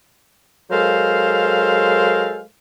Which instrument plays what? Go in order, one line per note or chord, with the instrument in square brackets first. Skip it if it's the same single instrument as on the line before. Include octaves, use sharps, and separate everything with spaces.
[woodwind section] F#3 G#3 A4 A#4 C5 F5